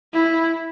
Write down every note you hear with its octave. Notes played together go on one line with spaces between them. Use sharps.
E4